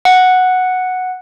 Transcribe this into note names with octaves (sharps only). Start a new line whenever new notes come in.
F#5